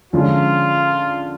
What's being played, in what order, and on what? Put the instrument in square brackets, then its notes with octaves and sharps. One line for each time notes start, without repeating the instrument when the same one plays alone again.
[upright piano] D3 F3 G#3 C#4 [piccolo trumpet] F4